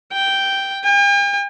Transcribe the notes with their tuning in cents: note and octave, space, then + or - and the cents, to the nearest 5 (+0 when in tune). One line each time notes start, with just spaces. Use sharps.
G5 -5
G5 +45